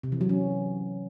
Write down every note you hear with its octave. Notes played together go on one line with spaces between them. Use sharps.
C3
E3
F#3
C#4